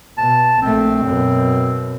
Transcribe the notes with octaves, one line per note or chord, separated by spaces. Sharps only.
B2 A5
A#1 A3 C4
F#2 B2